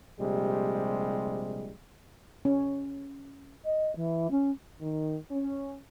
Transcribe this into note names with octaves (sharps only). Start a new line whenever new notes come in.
A#1 C3 G3 G#3
C#4
D#5
E3
C#4
D#3
C#4